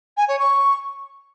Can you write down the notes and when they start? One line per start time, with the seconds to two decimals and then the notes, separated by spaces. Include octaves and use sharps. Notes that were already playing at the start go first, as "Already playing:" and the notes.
0.17 G#5
0.28 C#5
0.39 C#6